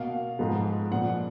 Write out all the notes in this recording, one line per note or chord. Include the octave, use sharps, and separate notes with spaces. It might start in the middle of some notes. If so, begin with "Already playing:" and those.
Already playing: B2 A#3 F5
G#2 F3 G#3 B3
A#2 F3 B3 F#5